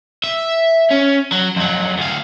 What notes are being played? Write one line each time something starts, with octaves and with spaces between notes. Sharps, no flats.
E5
C#4
F#3
F2 F#3
D2 F5